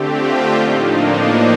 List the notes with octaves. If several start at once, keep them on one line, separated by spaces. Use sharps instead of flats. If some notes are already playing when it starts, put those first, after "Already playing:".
Already playing: D3 A3 C4 G4
F4
A2 F3 A#3 D4 D#4
D#4